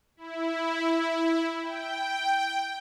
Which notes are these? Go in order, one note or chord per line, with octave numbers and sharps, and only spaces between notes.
E4
G5